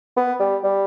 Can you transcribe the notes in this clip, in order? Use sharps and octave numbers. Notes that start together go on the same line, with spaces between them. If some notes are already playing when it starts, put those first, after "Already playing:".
B3
G3
G3